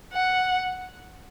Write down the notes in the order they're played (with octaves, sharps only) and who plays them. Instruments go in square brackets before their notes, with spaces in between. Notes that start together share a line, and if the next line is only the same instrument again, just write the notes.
[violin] F#5